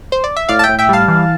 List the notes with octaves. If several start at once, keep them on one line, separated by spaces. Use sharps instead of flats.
C5
D5
E5
A2 D5 F5
A5
E5 G5
A2
E5 G5
G3 F5 A5
E3